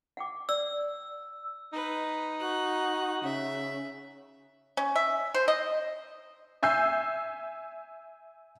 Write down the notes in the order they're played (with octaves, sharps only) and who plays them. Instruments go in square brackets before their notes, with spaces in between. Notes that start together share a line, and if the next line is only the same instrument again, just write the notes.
[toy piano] F#5 G5 D6
[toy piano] D5 [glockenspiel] E6
[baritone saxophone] D#4 [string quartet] B4
[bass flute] F#4 [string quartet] F#6
[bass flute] C#3 [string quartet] E5
[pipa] C#4
E5
C5
D#5
[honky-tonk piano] E5 G#5 E6 G6 C7